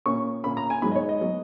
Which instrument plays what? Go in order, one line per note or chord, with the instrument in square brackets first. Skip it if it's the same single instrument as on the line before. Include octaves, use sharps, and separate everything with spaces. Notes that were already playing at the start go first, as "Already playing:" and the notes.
[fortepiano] A#2 A#3 C#4 C#6
A#2 A#3 C#4 B5
A#5
G#5
G#2 F#3 B3 B5
D#5
C#5
D#5
F#3 B3